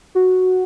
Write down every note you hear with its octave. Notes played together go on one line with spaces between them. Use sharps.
F#4